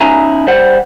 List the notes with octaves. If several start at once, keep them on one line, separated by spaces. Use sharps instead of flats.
C#4 D#4 E4 E5 G#5 A#5
G3 C5 F#5